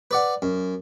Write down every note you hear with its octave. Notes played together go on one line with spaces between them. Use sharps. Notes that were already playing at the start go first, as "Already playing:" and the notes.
B4 D5 F#5
F#2